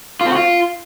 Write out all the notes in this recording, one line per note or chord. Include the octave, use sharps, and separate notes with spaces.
F4
C4
F#4
F4